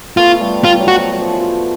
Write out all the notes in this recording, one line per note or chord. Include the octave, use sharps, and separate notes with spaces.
A3 B3 F4
G3 A3
G3 F4
F#3
F#4
F3
F#3
F3
E3
F3